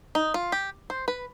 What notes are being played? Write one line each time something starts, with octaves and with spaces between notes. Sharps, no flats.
D#4
F4
G4
C5
B4